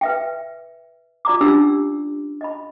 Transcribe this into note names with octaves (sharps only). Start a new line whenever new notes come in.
B4 E5 G5
F4 D5 A#5 D6
C#4 D4 G4 D5 E6
D#5 B5